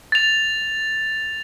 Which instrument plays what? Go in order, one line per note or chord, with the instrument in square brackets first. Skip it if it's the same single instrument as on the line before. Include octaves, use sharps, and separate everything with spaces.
[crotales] A6 F7